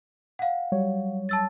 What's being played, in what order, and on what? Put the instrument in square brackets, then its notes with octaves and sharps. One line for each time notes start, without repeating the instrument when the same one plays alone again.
[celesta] F5 F#5
[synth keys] F#3 G3 C#5
[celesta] A5 E6 A6